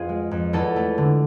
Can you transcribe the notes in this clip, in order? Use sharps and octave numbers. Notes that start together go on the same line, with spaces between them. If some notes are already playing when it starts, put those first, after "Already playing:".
Already playing: F2 B3 F4 G#4
G#3
F2
E2 A4
A3
D3